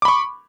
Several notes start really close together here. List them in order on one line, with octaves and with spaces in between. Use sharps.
D6 B5 C#6